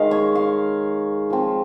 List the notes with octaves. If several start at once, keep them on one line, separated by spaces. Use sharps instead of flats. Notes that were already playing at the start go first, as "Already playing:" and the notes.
Already playing: D#3 G#3 F5
C#5
F5
F3 C4